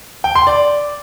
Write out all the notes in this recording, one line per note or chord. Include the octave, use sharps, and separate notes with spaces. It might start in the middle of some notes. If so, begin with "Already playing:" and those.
G5
C6
D5